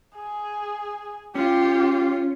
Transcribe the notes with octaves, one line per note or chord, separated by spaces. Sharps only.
G#4
C#4 F4 G4